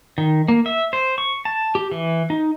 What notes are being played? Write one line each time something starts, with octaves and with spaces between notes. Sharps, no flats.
D#3
A#3
E5
C5
C#6
A5
G4
E3
D#4